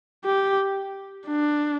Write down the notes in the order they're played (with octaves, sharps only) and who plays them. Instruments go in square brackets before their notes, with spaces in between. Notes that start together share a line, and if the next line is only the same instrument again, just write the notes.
[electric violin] G4
D4